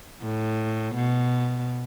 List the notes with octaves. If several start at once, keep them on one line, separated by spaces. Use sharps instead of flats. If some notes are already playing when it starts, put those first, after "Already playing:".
A2
B2